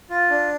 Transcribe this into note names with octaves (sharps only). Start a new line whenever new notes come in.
F4
D4